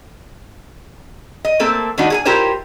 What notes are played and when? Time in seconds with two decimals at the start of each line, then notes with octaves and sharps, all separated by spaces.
1.45 D#5
1.60 A3 A#3 C4 A4
1.98 D#3 G3 A3 D4 D#4 F#4
2.10 G#4 A4 G#5
2.25 E4 F4 G4 A#4 C5 C#5